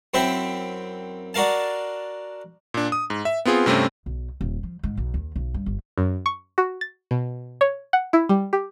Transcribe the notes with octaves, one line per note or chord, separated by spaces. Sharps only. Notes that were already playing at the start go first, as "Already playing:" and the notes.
F#2 C4 E4 E5 G5
D4 F#4 A#4 F5 A5
A#2 D4
D#6
G#2
E5
B3 C4 F4 G#4
G2 C3 A3 C4 C#4
B1
D#1
F3
G#2
B1
D#2
B1
G2
G1
F#2
C#6
F#4
A6
B2
C#5
F#5
E4
G3
G4